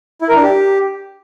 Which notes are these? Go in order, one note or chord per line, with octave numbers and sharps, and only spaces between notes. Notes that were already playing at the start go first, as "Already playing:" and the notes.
E4
A#4
D4
G4